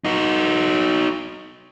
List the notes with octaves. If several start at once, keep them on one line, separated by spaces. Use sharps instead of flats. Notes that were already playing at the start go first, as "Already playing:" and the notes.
D#4 F#4